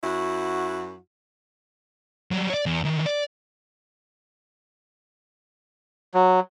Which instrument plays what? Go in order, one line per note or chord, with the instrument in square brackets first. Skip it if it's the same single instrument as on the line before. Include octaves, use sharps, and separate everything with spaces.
[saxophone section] F#2 E4 F#4
[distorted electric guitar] F#3 G3
C#5 D5
E2
D#3 E3
D5
[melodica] F#3